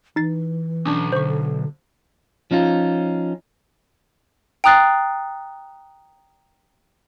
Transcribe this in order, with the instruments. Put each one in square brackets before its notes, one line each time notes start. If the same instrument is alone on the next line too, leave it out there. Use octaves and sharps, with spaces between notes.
[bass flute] E3 [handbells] D#4 A6 C7
[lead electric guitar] B1 [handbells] C#4 D4
[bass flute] D3 [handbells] C5 C#6
[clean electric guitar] F3 C#4 D#4 F4
[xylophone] G5 A#5 D#6 F#6 A6 C7